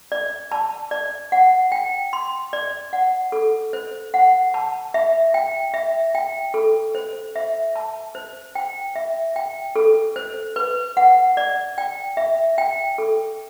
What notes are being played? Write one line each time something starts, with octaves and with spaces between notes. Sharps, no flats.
D5
A5
D5
F#5
G5
C6
D5
F#5
A4
C5
F#5
A5
E5
G5
E5
G5
A4
C5
E5
A5
C5
G5
E5
G5
A4
C5
B4
F#5
D5
G5
E5
G5
A4